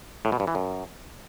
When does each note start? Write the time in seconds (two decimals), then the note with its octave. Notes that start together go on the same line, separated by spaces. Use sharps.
0.25 A2
0.32 B2
0.40 G2
0.47 E3
0.55 F#2